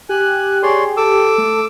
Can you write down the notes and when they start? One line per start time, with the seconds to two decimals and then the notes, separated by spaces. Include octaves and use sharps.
0.09 G4 G#5 F#6
0.63 G#4 C#5 D5 C6
0.97 A4 D6 E6
1.38 A3